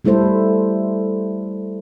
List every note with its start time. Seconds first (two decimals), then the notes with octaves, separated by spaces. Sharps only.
0.05 G3 A3 E4 A4 C5